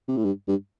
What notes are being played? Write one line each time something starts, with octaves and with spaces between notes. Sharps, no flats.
C3
A2
G2
G2